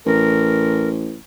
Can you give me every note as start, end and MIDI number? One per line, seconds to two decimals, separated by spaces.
0.06 1.16 33
0.06 0.89 70